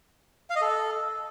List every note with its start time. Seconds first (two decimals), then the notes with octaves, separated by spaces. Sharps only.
0.50 F5
0.56 D#5
0.61 A4